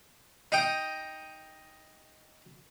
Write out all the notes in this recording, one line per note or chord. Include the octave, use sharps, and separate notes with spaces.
D#4 D#5 G5 D#6